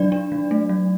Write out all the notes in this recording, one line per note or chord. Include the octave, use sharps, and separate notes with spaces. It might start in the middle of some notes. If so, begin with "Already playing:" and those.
Already playing: F#3 D4 D5
D4
F#3
A3
F#3